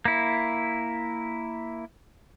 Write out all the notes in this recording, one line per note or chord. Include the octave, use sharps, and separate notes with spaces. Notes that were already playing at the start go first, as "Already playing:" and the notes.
A#3 E4